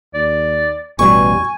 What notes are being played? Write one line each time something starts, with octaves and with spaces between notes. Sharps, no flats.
D#2 D5
A1 E2 B2 G3 G#5 C#6